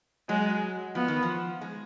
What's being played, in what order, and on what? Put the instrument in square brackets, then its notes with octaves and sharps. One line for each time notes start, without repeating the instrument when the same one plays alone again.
[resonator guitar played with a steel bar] F#3 [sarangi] G#3
[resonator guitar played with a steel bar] F3 [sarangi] B3
[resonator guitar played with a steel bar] D#3
F3
G#3